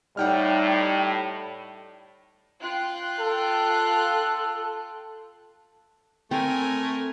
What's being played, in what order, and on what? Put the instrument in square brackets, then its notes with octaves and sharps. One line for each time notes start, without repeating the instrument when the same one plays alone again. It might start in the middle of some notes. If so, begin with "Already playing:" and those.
[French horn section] A2 [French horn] G3 [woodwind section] D#4 [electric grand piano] F#5 G5 F6
[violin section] F4 G5 F#6
[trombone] A4
[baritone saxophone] A3 [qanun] C4 [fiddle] A#4 G#5